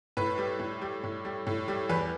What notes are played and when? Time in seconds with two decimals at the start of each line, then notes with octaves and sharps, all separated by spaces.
0.17 A2 B4
0.38 G3
0.60 A2
0.81 G3
1.04 A2
1.25 G3
1.47 A2
1.68 G3
1.89 E2 B4